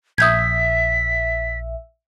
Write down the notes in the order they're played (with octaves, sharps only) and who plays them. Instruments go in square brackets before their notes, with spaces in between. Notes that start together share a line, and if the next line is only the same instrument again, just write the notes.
[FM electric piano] A#1 E5 [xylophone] D#6 G6 G#6 [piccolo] B6